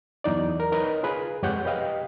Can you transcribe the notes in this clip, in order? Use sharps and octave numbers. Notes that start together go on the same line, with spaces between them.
E2 F#3 D#4 D5
A#4
D#4 A#4 B4 C#5 D#5
F4 G#4 B4
F2 G#3 G4 C#5 F#5 G6
G4 B4 D#5 F5 G5